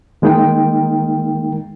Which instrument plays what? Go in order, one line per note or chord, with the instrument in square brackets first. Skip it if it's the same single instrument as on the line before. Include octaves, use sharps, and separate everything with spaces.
[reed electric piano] D#3 G#3 A#3 D#4 A#4 G5